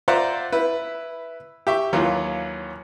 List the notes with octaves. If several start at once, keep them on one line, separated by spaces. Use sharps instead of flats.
F4 C5 D5 E5 F#5 A#5
E4 B4
G4 E5 C#6
D#2 E3 F#3 F4